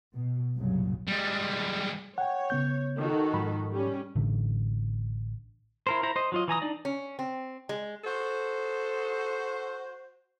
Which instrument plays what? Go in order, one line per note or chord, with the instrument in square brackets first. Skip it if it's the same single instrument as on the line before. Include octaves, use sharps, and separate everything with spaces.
[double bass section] B2
C2 F#2 A#2 C#3 F#3
[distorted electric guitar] G3 G#3
[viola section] C#5 [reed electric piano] F#5 G5
[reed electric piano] C#3 B3 G6
[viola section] D#3 F#4 A4
[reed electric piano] G#2 F3 B5
[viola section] G3 C#4
[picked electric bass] A1 D3
[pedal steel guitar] E4 A#4 C5
E4 C5 A#5
C5 D#5
F#3 F4 D#5
E3 G#5 A#5 D#6
D4 D#4 D5
[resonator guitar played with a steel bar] C#4
C4
G#3
[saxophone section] F#4 C5 [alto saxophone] A4